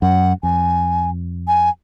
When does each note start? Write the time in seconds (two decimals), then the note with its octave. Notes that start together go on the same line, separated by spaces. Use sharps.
0.02 F#2 F#5
0.43 F2 G#5
1.48 G#5